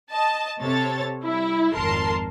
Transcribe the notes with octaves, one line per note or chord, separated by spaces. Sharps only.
D#5 A5
C3 A4 C#5 A6
G3 E4
G#1 F2 A#4 A5 C6